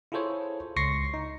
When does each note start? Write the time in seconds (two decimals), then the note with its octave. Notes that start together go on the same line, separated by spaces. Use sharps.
0.12 E4 F4 G#4 A4 C5 C#5
0.76 C#2 C6 C#6 A#6 C7 C#7
1.14 D#4